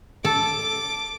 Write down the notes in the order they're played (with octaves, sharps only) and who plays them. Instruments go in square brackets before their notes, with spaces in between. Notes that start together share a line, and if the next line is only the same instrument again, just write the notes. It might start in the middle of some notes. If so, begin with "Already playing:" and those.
[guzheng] A4 [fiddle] D6